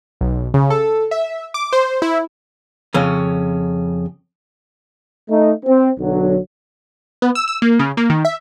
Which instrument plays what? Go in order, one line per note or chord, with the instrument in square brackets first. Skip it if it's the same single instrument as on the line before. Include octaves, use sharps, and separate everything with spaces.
[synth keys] B1
C#3
A4
E5
D6
C5
E4
[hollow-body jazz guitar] F2 C#3 C#4
[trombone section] A3 D#4
C4
B1 D3 F#3
[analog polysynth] B3
E6
E6
A#3
C#3
A#3
D#3
E5